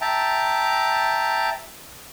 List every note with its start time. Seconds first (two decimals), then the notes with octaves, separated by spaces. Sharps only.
0.01 E5 G5 A5 A#5